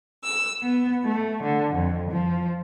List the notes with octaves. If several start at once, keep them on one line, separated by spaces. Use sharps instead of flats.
E6
B3
A3
D3
F2
F3